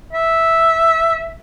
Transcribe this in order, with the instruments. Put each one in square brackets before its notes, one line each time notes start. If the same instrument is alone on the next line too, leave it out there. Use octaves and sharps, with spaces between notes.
[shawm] E5